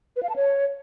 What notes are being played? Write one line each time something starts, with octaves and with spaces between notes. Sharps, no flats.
B4
F5
A5
C#5